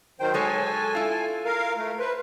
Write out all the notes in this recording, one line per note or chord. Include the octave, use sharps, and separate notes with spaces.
D#3 F#3 C5 G5
F#3 G#3 A4 C#5 G#5
E4 F4
A#4 F5
A3
B4 C5